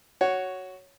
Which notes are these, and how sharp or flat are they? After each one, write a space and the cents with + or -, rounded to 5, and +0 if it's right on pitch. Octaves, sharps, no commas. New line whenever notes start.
F#4 +5 C#5 +0